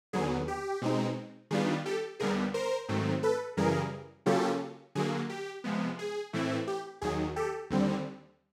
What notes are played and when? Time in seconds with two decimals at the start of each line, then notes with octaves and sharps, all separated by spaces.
0.13 D#2 D3 F#3 B3 G#4
0.48 G4
0.81 B2 G#3 C4 D#4
1.51 D#3 G3 B3 D4 F4 G#4
1.86 G4 A4
2.20 D#2 D3 G3 B3 G#4 A#4
2.54 A#4 C5
2.88 G#2 D#3 F#3 A3 C4
3.23 A4 B4
3.57 F#2 C#3 E3 G3 G#4 A#4
4.26 C#3 F#3 A#3 C#4 F4 G4 A4
4.95 D3 F#3 A#3 G#4
5.29 G4
5.64 C3 F3 G#3 B3
5.99 G#4
6.33 A2 E3 A3 C4 E4
6.67 G4
7.01 D#2 D#3 F#3 G#4
7.36 G4 A4
7.70 D#2 D3 G3 C4